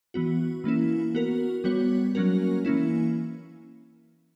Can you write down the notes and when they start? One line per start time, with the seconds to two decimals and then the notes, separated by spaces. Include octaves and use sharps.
0.14 E3 B3 F#4
0.64 E3 A#3 C#4 E4
1.15 B3 F#4 A#4
1.64 G3 B3 F#4 C#5
2.15 F#3 A#3 C#4 F#4 A#4
2.65 E3 A#3 C#4 E4